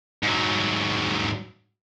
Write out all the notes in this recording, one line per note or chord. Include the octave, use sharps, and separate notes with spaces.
G#2 F#3